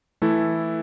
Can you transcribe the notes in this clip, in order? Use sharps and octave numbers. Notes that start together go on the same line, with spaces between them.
E3 A3 E4 A4